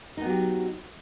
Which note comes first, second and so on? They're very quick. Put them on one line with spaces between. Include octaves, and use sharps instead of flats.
D#4 B3 F#3 G4